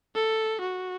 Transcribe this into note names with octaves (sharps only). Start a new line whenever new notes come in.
A4
F#4